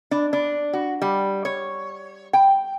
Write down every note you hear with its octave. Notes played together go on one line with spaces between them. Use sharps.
D4
D4
F#4
G3
C#5
G5